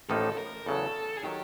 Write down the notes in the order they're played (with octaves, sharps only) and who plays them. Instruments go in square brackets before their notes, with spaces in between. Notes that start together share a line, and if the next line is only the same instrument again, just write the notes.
[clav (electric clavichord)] A1 A2 F3 A#3 D#4 [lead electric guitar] A4
[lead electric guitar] A4
A#4
[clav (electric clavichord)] E2 C#3 F#3 [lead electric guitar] A4
[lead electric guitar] G#4
[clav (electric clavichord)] D#3 F#3 [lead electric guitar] G4